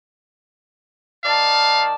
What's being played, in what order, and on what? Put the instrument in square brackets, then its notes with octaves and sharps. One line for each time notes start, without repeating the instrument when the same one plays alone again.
[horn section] D#3 D5 A5 [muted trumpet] F5